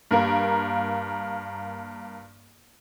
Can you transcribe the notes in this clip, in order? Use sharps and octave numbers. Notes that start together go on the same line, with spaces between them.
G2 A#3 A#4